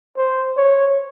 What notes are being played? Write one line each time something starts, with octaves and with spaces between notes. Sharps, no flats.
C5
C#5